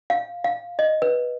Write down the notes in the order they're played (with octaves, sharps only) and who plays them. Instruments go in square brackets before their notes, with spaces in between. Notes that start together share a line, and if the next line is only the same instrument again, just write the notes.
[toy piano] F5
F5
D#5
B4